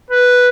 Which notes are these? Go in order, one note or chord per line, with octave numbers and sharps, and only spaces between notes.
B4